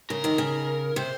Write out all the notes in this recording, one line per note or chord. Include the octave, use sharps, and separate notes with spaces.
C#3 A#4
C3 D#3
C#3
C3 C5